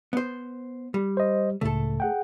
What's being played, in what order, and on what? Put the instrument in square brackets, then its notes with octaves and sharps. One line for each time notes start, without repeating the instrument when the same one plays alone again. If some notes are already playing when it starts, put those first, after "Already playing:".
[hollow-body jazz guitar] B3 C5
G3
[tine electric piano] C5 D#5
[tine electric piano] C#2 A2 C#3 [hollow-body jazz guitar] A3 A4
[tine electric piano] G#4 F#5 G5